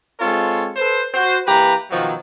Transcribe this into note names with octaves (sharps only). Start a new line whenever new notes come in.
G#3 C4 F4 A4 C#5
A4 B4 C5
F#4 C5
E3 A#3 G4 B4 A#5
B2 D#3 F3 F#3